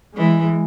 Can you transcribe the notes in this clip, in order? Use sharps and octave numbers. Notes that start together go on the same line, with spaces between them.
E3 G#3